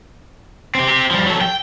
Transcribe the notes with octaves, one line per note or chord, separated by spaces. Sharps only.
C4 G4
C4 G4
F3 G3
F#3 A4
G5